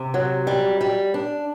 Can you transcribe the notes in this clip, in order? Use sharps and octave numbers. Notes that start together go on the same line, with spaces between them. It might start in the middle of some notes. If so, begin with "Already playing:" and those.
Already playing: C3
F#3
G3
G3
D4